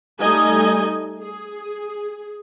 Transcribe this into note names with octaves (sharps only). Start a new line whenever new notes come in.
G3 A3 D#4 D#5 G#5
G#4